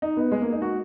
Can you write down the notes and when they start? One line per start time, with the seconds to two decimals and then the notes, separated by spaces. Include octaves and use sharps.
0.02 D#4
0.17 B3
0.32 G#3
0.41 A#3
0.52 D#4
0.62 F#4